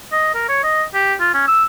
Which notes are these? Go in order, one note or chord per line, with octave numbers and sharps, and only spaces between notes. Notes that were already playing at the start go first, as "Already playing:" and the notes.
D#5
A#4
C#5
D#5
G4
F4
C#4
E6